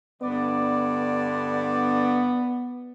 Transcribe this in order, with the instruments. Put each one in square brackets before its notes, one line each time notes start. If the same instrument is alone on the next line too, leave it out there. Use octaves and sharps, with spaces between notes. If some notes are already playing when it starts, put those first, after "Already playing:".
[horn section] G2 D3 D5 [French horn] B3